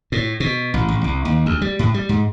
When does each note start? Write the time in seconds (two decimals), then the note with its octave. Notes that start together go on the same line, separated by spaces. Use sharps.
0.12 A2
0.40 B2
0.74 A1
0.88 A1
1.04 C2
1.25 D#2
1.46 D2
1.62 G3
1.79 A2
1.94 G3
2.09 G#2